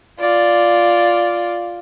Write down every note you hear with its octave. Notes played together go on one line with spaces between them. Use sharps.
F4 D5